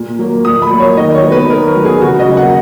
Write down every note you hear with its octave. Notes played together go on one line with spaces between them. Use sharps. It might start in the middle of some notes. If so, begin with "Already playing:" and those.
Already playing: A#2
F#3 A#3
A#2 D#6
B5
F#3 A#3
C#5
D#3 D#5
C#5
F#3 B3
B4
D#3 A#4
F#3 B3
G#4
C#3 F#4
D#5
F#3 A#3
F#5